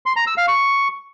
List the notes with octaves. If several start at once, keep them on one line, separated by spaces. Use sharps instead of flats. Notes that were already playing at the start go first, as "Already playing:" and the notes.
C6
A#5
E6
F5
C#6